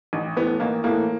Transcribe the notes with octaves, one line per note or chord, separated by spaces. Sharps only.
A1
A2 E3 B3
A1 A#3
A2 E3 A#3